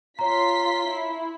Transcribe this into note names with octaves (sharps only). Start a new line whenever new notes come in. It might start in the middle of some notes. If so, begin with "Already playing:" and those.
F4 C#5 A#5 C6 B6
E4